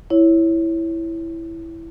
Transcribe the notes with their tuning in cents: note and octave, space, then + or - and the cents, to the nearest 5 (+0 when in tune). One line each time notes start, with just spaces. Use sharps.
E4 +0 C#5 +0